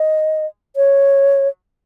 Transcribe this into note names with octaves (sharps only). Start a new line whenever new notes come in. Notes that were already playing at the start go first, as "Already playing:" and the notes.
Already playing: D#5
C#5